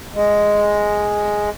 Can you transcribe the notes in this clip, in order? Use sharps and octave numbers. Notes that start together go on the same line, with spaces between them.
G#3